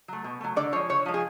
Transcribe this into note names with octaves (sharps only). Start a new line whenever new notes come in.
F#3 A3
B2
F#3 A3
D3 D5
F3 G#3 C#5
D3 C#5
F3 G#3
G#4